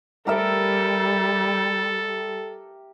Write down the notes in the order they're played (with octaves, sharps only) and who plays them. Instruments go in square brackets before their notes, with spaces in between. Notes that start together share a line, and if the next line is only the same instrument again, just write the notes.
[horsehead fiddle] G3 [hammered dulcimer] G4 A#4 E5 [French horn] A4